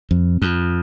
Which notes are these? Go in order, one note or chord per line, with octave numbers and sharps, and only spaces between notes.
F2
F2